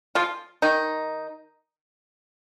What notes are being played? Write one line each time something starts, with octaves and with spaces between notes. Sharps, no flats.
F3 F4
D#3 D#4